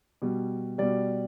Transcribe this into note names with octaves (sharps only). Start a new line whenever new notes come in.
B2 G3
B2 G3 D5